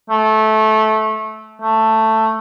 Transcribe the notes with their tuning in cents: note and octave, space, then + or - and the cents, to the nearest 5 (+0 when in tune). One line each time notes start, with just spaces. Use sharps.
A3 -15
A3 +10